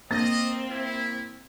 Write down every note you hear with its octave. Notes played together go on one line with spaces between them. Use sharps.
A#3 C4 D#5 A6
E4